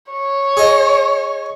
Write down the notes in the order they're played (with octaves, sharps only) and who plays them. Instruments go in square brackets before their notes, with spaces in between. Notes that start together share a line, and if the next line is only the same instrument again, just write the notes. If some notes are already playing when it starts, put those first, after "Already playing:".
[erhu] C#5
[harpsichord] G#4 D#5